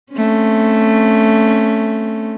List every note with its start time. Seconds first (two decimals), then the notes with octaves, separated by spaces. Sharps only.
0.13 A3 C4 C#4